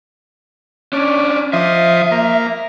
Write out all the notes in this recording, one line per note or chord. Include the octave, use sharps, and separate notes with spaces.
C#4 D4 D5
F3 C5 D#5 E5
A#3